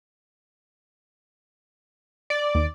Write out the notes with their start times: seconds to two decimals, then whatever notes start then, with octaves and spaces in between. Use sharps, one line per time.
2.30 D5
2.55 D#2